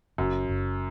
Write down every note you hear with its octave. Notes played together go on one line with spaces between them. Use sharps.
F#1 F#2
F#1